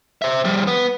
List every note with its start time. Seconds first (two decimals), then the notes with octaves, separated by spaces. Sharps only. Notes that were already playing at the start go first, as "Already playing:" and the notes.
0.22 C5 E5
0.45 F3 G3
0.67 B3